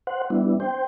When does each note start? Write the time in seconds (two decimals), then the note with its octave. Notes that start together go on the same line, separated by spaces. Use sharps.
0.07 C5 F#5
0.30 G3 B3 D4 E4
0.60 C5 G5